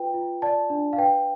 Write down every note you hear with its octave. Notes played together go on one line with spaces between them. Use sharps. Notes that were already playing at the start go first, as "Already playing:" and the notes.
Already playing: F4 B4 G5
F4
D5 A5
D4
F5
B4 G5